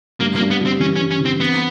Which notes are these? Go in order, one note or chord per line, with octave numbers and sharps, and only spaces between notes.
G2 A#3
A#3
G2
B3
G3 C4
E3 C#4
C#4
G2
C#4
E3 C4
B3 C4